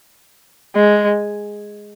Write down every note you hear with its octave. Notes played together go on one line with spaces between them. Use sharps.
G#3